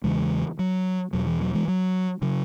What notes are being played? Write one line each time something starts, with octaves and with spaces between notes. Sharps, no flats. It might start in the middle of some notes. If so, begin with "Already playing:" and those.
E2 C#3 E3 G#3
F#3
E2 B2 F#3
E3
F#3
E3 G#3
F#3
C#3 F#3